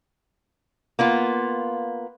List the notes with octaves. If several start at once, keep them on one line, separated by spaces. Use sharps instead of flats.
A#3 B3 F4